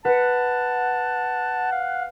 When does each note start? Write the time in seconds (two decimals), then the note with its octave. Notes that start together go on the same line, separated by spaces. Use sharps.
0.05 B4 F#5 A5
1.72 F5